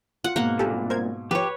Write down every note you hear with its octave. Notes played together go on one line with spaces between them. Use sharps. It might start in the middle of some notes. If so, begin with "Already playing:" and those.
F4 F#5
G#2 B2 A#3 F#5
C2 A#2 G4 A4
A#4 C5 G#6
F3 G4 B4 C#5